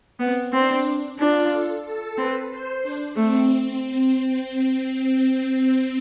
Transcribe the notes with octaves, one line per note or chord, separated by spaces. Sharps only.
B3 C4
C4 D4
D4 F4
A4
A4
C4 B4
C5
D4
A3 C4